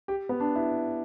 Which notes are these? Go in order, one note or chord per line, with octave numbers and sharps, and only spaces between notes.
G4
B3
D4
E4